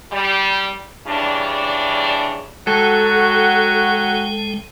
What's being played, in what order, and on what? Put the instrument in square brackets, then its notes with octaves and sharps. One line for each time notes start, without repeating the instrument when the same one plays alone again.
[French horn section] G3
C#3 E3 G3 D4
[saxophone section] F#3 F#4 [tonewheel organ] G#3 G5 [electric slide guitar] A4